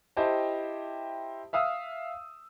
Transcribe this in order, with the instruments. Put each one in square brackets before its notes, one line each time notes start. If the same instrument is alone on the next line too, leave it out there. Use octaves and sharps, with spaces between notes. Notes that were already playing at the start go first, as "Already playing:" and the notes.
[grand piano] E4 G4 C5 D#5 G5 A5
E5 F5 D#6 E6